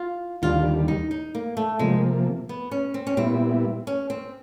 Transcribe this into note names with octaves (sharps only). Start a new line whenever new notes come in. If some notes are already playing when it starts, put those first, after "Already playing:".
Already playing: F4
D#2 D3 G3 F4
D#4
D#4
A#3
A3
C3 F3 G#3 A#3
B3
C#4
C4
C#4
A#2 G3 B3 C4 E4
C#4
C4